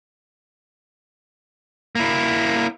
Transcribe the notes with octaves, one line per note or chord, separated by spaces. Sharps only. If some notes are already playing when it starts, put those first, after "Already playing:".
A#3 E4